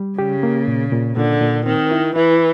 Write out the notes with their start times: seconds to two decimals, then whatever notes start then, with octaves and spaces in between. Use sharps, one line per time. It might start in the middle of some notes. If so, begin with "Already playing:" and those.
Already playing: G3
0.18 C#3 G4
0.43 A#3
0.67 A#2
0.93 A#2
1.17 A#2 D3
1.41 A#2
1.66 D#3 C4
1.91 E4
2.16 E3 E4